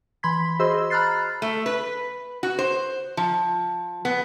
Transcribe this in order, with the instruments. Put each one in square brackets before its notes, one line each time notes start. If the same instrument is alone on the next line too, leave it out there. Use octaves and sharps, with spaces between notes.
[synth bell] E3 B5 C6 G#6 B6
F#4 G#4 C5 D#5 C6 E6
A#5 B5 F6 F#6 A6 C7
[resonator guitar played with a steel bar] A3
B4
F#4
C5
F3
B3